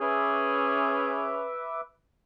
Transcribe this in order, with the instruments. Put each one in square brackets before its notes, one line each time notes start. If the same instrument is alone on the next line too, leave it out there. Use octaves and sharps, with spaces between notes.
[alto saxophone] C#4 [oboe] G#4 [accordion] B4 E5 D6